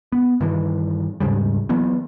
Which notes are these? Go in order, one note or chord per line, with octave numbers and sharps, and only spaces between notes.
B3
G2 D#3 E3
D#2 G#2 C#3 G3
E3 F#3 A#3 B3